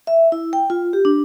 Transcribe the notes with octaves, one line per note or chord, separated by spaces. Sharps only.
E5
E4
G5
F4
G4
D4